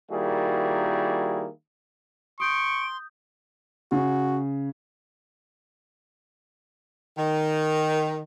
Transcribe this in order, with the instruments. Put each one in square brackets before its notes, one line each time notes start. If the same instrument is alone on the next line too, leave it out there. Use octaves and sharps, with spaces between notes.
[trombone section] D#3 G3 A#3 E4 F#4 G#4
[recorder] C6 [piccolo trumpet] C#6 [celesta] D#6 G6 [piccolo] D7
[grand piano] C#3 [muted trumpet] F#4
[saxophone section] D#3